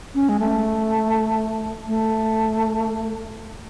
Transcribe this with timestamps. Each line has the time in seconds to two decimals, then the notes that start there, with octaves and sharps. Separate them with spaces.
0.15 C#4
0.29 G#3
0.40 A3
1.87 A3